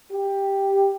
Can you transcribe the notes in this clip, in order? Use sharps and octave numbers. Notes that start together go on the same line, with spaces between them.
G4